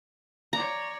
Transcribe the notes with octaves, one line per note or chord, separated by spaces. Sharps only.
C#5 D5 A#5